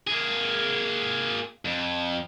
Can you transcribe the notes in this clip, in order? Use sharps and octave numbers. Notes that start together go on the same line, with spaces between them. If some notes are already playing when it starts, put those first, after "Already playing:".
A#3 G#4
F2